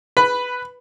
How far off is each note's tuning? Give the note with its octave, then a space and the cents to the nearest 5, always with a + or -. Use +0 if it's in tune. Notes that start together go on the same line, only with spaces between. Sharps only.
B4 +0 B5 +10